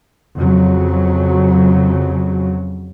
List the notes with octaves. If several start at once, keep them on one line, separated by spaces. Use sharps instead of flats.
F2 C#3 F#3